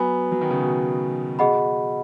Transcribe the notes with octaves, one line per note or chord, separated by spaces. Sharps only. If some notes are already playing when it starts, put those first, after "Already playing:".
Already playing: F#3 B3 B4 G#5 B5
F#3
D#3
C#3
B2
B2 G#4 D#5 F#5 B5